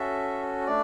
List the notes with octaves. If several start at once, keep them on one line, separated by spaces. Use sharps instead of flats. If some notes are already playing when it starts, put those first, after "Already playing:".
Already playing: C#4 F#4 A4 E5
A3 D4 D5